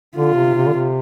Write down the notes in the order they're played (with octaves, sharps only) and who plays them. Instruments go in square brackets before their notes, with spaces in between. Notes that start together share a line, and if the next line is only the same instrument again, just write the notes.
[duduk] D3 [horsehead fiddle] F4
[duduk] C3
C3
D3
C3